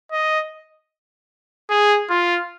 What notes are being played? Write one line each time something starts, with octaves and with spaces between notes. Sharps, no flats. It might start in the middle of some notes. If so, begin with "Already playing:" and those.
D#5
G#4
F4